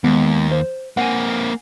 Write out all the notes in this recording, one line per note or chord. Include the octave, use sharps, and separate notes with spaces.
D#2 G#3 B3
C5
A#3 C4 F#5 G#5